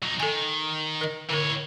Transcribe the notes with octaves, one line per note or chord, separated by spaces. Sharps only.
F#3 D#4
D#3 A4 G#5
A#4 D#5
D3 E3 A#4 C#5